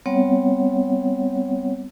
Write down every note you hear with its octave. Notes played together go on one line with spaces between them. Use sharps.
G3 B3 C4 C#5 F#5